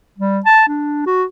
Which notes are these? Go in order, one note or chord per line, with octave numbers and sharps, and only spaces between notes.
G3
A5
D4
F#4